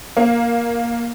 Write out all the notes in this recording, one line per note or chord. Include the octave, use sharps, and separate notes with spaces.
A#3